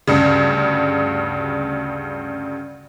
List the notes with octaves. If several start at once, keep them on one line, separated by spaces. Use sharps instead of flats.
D2 G2 C#3